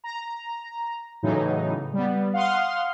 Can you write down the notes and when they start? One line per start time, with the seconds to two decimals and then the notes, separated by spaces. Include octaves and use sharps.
0.04 A#5
1.23 A2 C#3 E3 F#3 D#4
1.93 G3 B3
2.33 F5 F#5 C6 D#6 F6